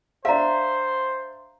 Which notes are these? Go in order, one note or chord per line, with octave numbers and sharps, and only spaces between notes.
D4 C5 E5 F5 A#5